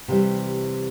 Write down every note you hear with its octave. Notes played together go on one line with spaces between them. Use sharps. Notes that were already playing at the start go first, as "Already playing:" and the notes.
C3 E3 G3